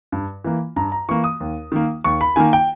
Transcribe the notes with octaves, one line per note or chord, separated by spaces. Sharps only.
G2
E3 A#3
G2 A#5
A#5
E3 A#3 C#6
D#6
D#2
D#3 A#3
D#2 C#6
B5
D#3 A#3 G#5
G5